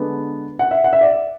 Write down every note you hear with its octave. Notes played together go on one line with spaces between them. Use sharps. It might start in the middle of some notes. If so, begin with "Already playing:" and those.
Already playing: D3 G#3 B3 D4
F#5
E5
F#5
E5
D5